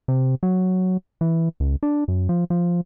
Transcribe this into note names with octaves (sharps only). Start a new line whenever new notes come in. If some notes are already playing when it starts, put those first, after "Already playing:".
C3
F#3
E3
C#2
D4
F#2
F3
F3